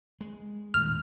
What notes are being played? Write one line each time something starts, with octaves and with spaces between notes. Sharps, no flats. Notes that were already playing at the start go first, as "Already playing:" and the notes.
G#3
D#1 D#2 A2 F6